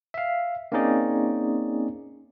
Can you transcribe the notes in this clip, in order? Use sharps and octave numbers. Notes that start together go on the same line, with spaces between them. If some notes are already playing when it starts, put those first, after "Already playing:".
E5 F5
A#3 C4 C#4 D#4 G#4 D5